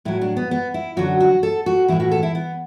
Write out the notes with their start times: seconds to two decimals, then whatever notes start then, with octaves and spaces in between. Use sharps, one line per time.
0.05 A2 F#3 E4
0.21 D4
0.37 B3
0.51 B3
0.74 E4
0.97 F#2 D3 F#3 F#4
1.20 F#4
1.43 A4
1.66 F#4
1.88 A2 E3 E4
2.00 F#4
2.12 A4
2.23 E4
2.35 B3